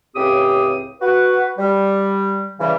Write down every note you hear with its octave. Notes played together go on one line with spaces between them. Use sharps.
C#2 A2 C#3 C4 G4 D#6
F#4 B4
G3
C#3 E3 G3